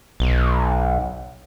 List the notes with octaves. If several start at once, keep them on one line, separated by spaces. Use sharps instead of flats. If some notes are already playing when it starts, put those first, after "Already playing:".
B1